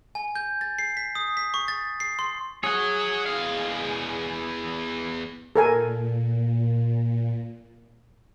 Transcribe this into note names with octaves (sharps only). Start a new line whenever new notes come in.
G#5
G6
A6
C7
B6
D#6
B6
C#6
A6
C7
C6
G#4 C#5 F#5
E2 F5
A#2 A4 A#4 G#5